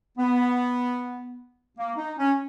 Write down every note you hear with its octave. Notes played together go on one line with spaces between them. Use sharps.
B3
A#3
D#4
C#4